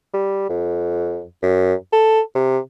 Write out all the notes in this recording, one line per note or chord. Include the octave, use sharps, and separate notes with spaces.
G3
F2
F#2
A4
C3